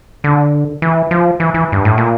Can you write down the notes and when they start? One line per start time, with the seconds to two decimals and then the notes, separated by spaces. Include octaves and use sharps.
0.24 D3
0.82 E3
1.11 F3
1.40 E3
1.54 E3
1.72 G2
1.85 A2
1.98 A#2